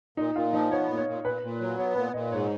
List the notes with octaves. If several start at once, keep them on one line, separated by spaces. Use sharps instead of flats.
A#2 D#4
A#2 F4
F3 D#4
B3 C#5
A#2
C#5
A#2
A#2 B4
A#2
F#3
B3 C#5
A#2 B4
A#2 D#5
G#2 C#5